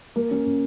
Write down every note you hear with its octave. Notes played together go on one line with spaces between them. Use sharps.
A#3
C#4
C#3